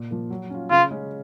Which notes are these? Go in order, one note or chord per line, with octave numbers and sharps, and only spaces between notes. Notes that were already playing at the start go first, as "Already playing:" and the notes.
Already playing: A#2
F3 A#3
F#3
C#4 F4
C#3 F4
G#3 C#4 G#4